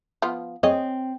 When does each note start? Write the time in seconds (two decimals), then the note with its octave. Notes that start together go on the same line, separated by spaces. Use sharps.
0.22 F3 B3 F4
0.63 C4 G#4 C#5 D#5